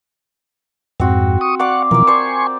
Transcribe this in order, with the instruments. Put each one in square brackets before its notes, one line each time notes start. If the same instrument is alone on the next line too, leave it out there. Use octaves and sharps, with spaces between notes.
[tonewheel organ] F2 G#2 [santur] C4 F#4
[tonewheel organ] C#6 D#6
[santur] D5 F5 D6 [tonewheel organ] F#5 C#6
[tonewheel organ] B2 E3 F3 [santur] A#4 D5
[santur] C5 D5 [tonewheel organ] G#5 C6 C#6